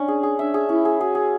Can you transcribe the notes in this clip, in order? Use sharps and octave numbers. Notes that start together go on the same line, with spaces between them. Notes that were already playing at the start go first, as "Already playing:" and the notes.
Already playing: C#4 D4
G#4
G#4
D4 E5
G#4
C#4 E4
G#4
F#4 G#4
G#4